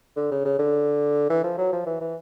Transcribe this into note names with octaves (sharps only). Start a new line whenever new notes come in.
D3
C#3
C#3
D3
E3
F3
F#3
F3
E3
E3